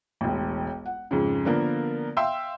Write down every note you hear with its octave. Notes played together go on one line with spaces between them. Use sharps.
E1 A1
F#5
F2 G#2 C#3
D3 F3 A#3 B3 A#4
E5 F5 G5 C6 E6